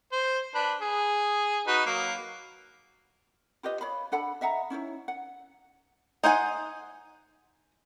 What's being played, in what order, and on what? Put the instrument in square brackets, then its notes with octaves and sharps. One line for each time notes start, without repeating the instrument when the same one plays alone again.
[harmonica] C5
D4 B4
G#4
D#4 F#4 B4
F#3 A#3
[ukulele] F4 G4 B4 D#5
C#5 F5 B5
D4 A4 F#5 B5
D#5 E5 F#5 A#5
C#4 D#4 E4 C#5
F#5
[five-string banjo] D#4 C5 F#5 G#5